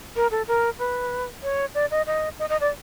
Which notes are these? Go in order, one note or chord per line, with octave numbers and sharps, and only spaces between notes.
A#4
A4
A#4
B4
C#5
D5
D#5
D#5
D#5
D#5
D5